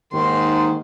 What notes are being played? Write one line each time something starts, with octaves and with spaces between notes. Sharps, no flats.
D#2 G#2 D#3 C6